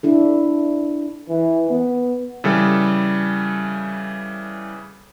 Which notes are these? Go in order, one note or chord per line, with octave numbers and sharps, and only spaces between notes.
D4 E4 A4
E3
B3
C#3 E3 G3 A4